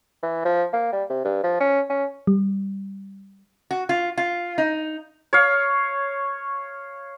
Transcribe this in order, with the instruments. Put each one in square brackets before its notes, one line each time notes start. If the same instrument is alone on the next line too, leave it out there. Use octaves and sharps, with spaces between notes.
[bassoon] E3
F3
A#3
G3
C3
G2
F3
C#4
C#4
[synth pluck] G3
[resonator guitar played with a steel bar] F#4
F4
F4
D#4
[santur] C#5 F5